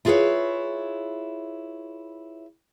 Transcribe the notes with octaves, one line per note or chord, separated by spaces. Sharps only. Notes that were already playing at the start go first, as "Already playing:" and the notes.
E4 F4 G#4 A#4 B4 C#5